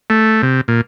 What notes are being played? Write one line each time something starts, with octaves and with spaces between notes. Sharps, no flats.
A3
C3
A#2